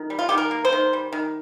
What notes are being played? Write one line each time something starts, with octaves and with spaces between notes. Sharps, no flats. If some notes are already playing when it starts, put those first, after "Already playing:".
Already playing: D#3
G3
F4
D#3 G4
A#4
A#3
C5
D#3
G3
D#3